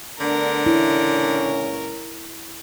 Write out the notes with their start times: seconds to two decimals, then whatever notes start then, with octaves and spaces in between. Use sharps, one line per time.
0.21 D3 A3 B3 D4 A#4
0.66 C#2 A#2 C#4 E4